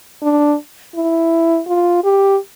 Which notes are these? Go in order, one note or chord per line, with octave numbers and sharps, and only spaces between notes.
D4
E4
F4
G4